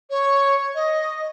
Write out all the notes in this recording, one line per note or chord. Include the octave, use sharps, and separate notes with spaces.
C#5
D#5